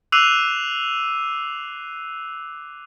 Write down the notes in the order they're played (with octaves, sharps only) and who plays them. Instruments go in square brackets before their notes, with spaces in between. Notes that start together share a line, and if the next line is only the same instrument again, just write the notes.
[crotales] D6 E6 F#6 C7 D#7 F7